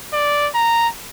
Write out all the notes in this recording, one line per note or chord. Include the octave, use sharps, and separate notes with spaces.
D5
A#5